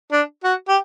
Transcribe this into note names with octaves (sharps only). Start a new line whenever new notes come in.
D4
F#4
G4